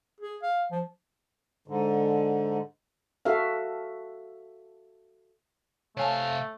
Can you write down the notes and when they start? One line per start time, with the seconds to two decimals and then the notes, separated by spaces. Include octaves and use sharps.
0.21 G#4
0.43 F5
0.72 F3
1.68 G#2 D3
3.25 F#4 A4 E5 F5
5.97 C3 A3 C#5 F5 G#5 A5